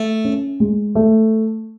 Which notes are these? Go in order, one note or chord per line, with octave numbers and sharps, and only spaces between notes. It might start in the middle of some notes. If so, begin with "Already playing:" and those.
Already playing: A3
C#4
G#3
A3